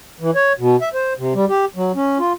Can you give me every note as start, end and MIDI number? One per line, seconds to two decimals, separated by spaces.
0.21 0.31 52
0.35 0.53 73
0.59 0.76 47
0.81 0.89 76
0.94 1.13 72
1.19 1.33 48
1.35 1.45 55
1.49 1.65 67
1.76 1.92 54
1.95 2.18 61
2.19 2.33 65